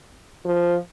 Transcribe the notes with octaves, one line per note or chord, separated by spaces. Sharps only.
F3